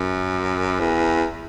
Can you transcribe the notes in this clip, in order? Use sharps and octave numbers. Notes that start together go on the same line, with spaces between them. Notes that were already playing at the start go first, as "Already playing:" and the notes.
Already playing: F#2
E2